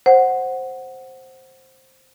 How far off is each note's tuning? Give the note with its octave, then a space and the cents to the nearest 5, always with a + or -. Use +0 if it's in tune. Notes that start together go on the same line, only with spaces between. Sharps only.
C5 +10 F#5 +0